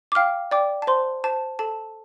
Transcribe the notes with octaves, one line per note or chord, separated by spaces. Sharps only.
D6
F5 G5 F6
D5 G5 D6
A5
C5 C6
C5 A5
A4 A5